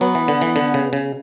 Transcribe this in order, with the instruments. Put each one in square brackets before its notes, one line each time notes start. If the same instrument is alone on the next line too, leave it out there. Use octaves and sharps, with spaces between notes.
[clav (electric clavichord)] F#3 [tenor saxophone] B3
[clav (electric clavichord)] E3
D3
E3
D3
C#3
C#3